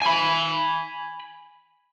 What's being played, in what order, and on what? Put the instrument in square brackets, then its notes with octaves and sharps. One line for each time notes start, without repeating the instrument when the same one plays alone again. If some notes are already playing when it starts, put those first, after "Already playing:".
[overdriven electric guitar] G#5 B5